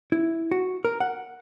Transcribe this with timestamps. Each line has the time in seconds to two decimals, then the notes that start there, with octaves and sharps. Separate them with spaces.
0.12 E4
0.51 F#4
0.85 A#4
1.00 F#5